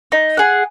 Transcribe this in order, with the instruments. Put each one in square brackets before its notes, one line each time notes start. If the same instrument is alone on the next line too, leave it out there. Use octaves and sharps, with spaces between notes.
[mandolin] D#4
G#4 F#5